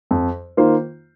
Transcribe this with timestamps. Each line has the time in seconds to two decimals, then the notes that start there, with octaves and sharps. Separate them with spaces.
0.11 F2
0.57 D#3 A#3 F4 C5